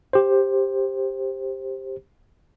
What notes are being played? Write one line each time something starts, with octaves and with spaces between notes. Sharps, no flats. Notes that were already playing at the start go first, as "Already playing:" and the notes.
G4 C5